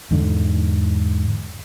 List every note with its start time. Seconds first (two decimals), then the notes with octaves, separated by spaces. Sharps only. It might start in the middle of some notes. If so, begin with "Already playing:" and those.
0.11 E2 G#2 D3